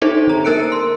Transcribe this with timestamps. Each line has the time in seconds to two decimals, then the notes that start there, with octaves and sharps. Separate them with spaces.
0.02 D4 D#4 A4 C5 D5 E5
0.27 D3 A#5
0.44 A#3 A#4 E6 F#6 C#7 D7
0.72 C6